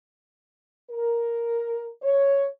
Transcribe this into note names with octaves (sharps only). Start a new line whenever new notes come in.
A#4
C#5